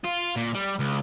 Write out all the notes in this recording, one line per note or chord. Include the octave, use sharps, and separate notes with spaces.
F4
A#2
G3
C#2